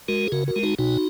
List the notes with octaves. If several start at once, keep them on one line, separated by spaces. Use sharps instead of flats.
G#3 F#4 A#4
G#4
C#3 F#4 A#4
F#4 A#4
G#3
D#4 F#4
B2 D#4 F#4